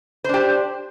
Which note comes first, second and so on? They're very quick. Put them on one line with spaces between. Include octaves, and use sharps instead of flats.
C5 D4 G4